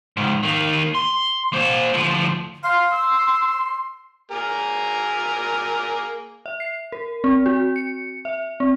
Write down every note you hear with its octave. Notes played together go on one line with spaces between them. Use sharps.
C#2 G#2
D#3 A#3
C6
A#3 C5
D2 F3
F5 C6
E6
A#3 G#4 A#4
E5
C7
A#4
C4
F#4
C#7
E5
C4